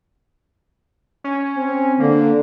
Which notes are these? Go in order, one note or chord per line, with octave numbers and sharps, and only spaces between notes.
C#4
C4
D3 A#3